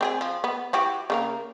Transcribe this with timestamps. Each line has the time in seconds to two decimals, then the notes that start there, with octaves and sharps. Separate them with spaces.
0.01 C4 G4 G#4
0.21 F3
0.44 B3
0.73 E4 F#4 G4
1.10 C#3 A#3 A#4